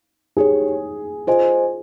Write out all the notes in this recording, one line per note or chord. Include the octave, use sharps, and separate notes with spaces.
D#4 G4 G#4 C#5
F4 G#4 C5 D#5 G#5